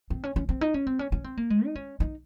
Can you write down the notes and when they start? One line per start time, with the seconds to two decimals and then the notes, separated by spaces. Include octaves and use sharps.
0.10 C4
0.24 C#4
0.36 C#4
0.49 C4
0.61 D#4
0.74 C#4
0.87 C4
0.99 C#4
1.12 C#4
1.24 C4
1.37 A#3
1.50 G#3
1.66 D#4
1.75 C#4
2.00 D#4